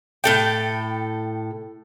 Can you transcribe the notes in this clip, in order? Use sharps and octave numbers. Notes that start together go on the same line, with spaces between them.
A2 A4 G5